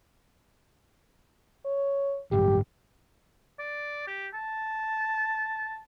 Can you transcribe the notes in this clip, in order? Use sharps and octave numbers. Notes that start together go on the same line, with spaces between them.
C#5
A1 G2 G4
D5
G4
A5